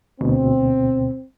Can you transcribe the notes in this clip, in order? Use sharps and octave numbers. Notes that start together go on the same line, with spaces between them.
D2 B2 C4